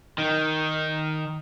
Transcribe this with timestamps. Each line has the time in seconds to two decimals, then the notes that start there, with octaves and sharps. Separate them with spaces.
0.18 D#3